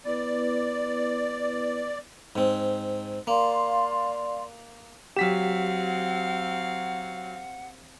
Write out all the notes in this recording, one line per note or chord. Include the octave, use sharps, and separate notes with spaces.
B3 E4 B4 D5
G#2 C4
A#3 D5 F5 C6
F#3 C4 G4 F5 F#5 B6 E7